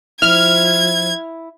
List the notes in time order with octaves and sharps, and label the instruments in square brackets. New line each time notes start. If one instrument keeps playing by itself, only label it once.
[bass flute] F3 [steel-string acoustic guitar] E4 [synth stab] F6 [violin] G#6